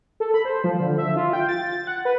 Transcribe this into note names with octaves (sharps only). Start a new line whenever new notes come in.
A4
B5
C5
F3
D3
E5
F4
G5
A6
F#5
B4